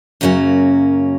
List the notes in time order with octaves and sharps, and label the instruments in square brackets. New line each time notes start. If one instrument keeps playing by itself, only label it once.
[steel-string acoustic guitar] F#2 C#3 F#3 A#3 C#4